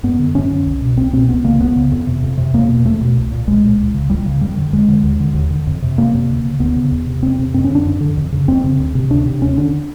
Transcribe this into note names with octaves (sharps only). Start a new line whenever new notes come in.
F#2 B3
D3
F#2 C#4
D3
C2
B2
C2 C4
B2 C4
C#2 B3
C#3 A#3
C#2 B3
C#3
F2
C3
F2
C3
E2 A#3
B2
E2 A3
B2
C2
A#2
C2 G#3
A#2
C#2
C#3
C#2 G3
C#3
F2 G3
D3
F2 G#3
D3
D#2
D3
D#2
D3
F2
C3
F2 A#3
C3
D2
C#3
D2 B3
C#3
E2
C3
E2 C4
C3
F#2 C4
C#4
D3 D4
F#2
D3
F2
C#3
F2 C4
C#3
D2
C3
D2 D4
C3
D#2 C#4
D3 D4